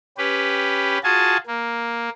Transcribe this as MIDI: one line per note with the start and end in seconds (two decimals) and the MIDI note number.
0.18 0.98 61
0.18 0.98 67
0.18 0.98 71
1.04 1.37 65
1.04 1.37 66
1.04 1.37 68
1.04 1.37 80
1.04 1.37 81
1.47 2.09 58